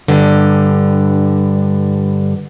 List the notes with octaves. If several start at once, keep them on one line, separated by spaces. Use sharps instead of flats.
G2 D3